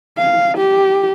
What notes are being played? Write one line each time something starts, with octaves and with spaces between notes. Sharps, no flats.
F5
G4